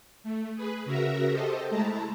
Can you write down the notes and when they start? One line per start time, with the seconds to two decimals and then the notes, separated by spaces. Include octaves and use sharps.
0.23 A3
0.55 G#4 B4
0.85 C#3 F#4 A#4 E5 A#5
1.30 G4 A4 C5 D#5
1.70 G#3 A3 E4 A5 A#5